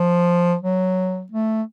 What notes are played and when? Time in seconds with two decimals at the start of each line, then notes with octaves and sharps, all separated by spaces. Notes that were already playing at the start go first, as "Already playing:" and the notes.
Already playing: F3
0.62 F#3
1.31 A3